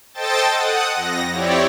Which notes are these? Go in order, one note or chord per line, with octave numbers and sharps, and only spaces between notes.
A4 C5 D#5 G5 A5 A6
F#5 D#6
F2 A#6
C4 E4 G4 C#5 D5